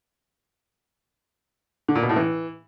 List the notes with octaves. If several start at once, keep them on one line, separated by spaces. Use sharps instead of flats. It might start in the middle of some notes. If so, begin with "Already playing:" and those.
D3
A#2
B2
A2
E3